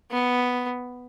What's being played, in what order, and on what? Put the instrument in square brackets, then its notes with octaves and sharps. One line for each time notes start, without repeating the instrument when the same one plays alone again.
[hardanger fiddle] B3